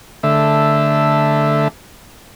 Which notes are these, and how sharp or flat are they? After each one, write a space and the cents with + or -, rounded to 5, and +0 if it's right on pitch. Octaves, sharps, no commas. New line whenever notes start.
D3 +0 A3 +0 E5 +0